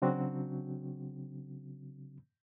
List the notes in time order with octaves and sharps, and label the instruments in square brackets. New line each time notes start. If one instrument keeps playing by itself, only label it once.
[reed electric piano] C#3 F#3 C4 D4 F#4